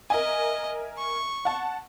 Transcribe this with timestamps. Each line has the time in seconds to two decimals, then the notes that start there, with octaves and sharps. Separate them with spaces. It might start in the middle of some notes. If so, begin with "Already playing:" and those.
0.10 A#4 D#5 E5 G#5
0.98 C#6
1.45 F#5 A5